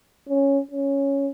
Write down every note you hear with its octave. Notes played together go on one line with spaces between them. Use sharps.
C#4
C#4